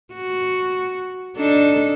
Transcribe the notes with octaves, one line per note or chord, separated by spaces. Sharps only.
F#4
D4 D#4 A4